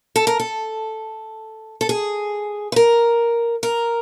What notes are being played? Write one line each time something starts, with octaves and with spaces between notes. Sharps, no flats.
A4
A#4
A4
A4
G#4
B4
A#4
A#4